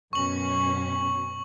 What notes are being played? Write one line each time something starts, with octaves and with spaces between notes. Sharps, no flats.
F#2 B2 C#4 C#6 F#7